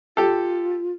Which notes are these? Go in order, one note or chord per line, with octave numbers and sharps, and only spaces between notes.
F4 G4 A4